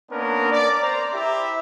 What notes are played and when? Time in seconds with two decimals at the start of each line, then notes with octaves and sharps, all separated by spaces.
0.11 A#3 B3 C#4 D4 A#4
0.51 D5
0.82 C5 A#5
1.14 E4 G4 E5